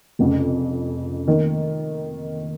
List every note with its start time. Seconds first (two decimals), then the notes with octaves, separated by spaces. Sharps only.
0.19 F1 F2 C#3
1.28 D#3 A#3